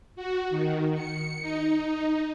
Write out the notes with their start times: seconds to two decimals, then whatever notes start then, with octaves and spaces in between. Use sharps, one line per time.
0.16 F#4
0.50 D#3
0.94 C#7
1.41 D#4